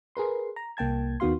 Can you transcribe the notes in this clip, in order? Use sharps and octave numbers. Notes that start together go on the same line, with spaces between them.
G#4 A#4 B4 C6
A#5
C2 A#3 G5 A5 G#6
D#2 D#3 B3 F#4 F5 C6